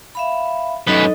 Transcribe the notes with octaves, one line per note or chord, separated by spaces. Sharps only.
E5 F5 B5
F#2 D#4 A4 B4 D#5